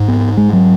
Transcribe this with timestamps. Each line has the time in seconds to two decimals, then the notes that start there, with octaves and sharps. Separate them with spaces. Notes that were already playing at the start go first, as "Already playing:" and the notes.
Already playing: G#2
0.08 B3
0.37 G#3
0.53 F#3